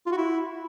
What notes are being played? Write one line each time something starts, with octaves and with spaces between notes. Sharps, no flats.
F4
F#4
E4